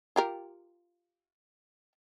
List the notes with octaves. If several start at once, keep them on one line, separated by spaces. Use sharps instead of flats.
F4 G4 A#4